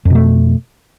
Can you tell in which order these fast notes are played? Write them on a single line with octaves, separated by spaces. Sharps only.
F2 B2 A3